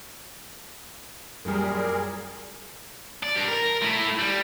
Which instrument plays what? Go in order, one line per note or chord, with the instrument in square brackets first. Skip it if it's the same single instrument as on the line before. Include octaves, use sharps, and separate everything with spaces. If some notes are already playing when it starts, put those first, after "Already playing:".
[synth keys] F#2 G3 [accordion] A#2 G#4 A#4
[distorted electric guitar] D5
G3 D4
A#4
A3 E4
G3